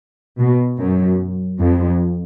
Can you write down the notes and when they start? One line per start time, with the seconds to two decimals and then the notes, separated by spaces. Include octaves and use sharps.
0.39 B2
0.79 F#2
1.59 F2